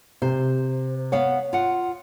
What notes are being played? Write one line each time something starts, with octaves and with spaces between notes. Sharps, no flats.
C3 C5
B3 C#5 F5 F#5
F4 F#5